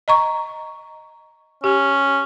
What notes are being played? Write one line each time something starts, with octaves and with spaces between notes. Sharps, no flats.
D#5 A#5 C#6
C#4 G4